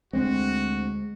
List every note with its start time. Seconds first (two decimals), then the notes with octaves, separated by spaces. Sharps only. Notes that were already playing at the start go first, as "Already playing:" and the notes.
0.13 D2 G#3 C4 F#4